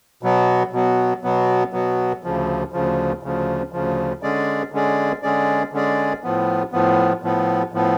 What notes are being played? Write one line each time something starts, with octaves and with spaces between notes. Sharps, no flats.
B2 F#3 B3
B2 F#3 B3
B2 F#3 B3
B2 F#3 B3
D2 C#3 F3
D2 C#3 F3
D2 C#3 F3
D2 C#3 F3
D3 G#3 C#4 G#4 D5
D3 G#3 C#4 G#4 D5
D3 G#3 C#4 G#4 D5
D3 G#3 C#4 G#4 D5
A2 F3 B3
A2 F3 B3
A2 F3 B3
A2 F3 B3